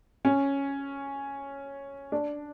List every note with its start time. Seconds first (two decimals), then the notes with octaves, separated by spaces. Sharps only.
0.25 C#4
2.12 D4